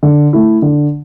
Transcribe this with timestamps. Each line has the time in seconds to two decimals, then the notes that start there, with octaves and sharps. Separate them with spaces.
0.03 D3
0.33 A3 E4
0.62 D3